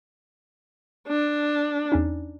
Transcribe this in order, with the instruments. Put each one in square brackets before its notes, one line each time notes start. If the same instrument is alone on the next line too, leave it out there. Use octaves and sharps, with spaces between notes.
[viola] D4
[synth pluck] E2 C#4 D#4